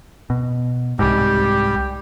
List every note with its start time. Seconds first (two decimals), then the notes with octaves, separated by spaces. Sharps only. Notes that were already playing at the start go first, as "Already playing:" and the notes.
0.30 B2
0.99 C2 G#2 G3 G4